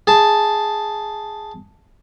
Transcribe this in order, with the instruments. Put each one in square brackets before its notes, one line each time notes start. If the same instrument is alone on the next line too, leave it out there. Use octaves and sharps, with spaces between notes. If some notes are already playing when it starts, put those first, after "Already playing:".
[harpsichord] G#4 A5